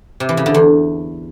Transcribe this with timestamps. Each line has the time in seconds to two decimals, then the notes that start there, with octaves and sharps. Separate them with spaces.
0.20 C3
0.29 E3
0.37 C#3
0.46 D3
0.54 E2